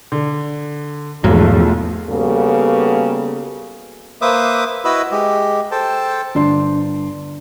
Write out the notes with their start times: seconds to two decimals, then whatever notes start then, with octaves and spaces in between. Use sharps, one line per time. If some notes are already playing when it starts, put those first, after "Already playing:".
0.12 D3
1.24 B1 E2 G#2 F3 F#3 A3
2.08 C#3 G3 A#3 B3 F#4 A4
4.22 A#3 B4 C5 E5 D6 D#6
4.85 E4 F#4 B4 D#5 B5 E6
5.12 G#3 G4
5.71 A4 C5 G5 A5
6.35 G1 D4 C6